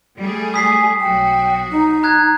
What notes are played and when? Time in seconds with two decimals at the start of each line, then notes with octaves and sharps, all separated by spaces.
0.19 G3 A3 G#4
0.54 G#5 D#6 B6 C7
1.00 B1 F#3 F#4 G5
1.71 D#4
2.03 A#5 F#6 G#6